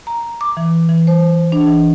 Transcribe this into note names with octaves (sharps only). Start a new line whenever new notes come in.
A#5
D6
E3
E3
C5
D4
E3